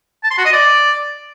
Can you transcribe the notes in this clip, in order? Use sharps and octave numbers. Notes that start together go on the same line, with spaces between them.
A5
C6
F#4
D#5
D5